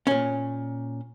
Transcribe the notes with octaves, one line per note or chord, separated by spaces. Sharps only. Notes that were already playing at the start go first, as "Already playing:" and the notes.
A#2 C#4